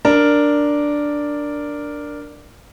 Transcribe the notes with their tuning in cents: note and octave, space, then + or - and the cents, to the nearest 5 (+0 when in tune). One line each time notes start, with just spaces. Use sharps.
D4 +0 A#4 +0